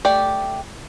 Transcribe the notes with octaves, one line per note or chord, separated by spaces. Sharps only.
A3 G4 D5